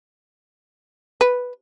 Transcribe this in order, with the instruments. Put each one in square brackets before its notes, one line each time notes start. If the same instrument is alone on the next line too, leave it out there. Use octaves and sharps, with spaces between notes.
[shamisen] B4